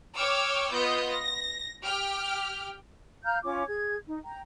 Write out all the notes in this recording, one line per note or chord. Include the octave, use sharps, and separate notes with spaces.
C#5 G5 C#6 D6 E6 F6
B3 F4 D#5 G6
A#6
G4 G5 F6
F5 A#5 F6 G6
C#4 F4 D6
G#4 G#6
D#4
G5 A#5